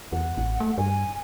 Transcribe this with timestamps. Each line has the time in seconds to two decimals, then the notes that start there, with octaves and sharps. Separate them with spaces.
0.12 E2 F#5
0.37 A1
0.60 A3
0.78 G2 G#5